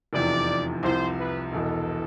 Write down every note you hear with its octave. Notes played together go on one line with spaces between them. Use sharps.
F1 E2 C3 F3 D5
C2 C3 F3 C5
B4
E1 E2 B2 A4